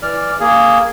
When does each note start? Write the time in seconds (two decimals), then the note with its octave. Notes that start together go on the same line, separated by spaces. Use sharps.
0.02 E3 D5 F6
0.40 A#3 G#4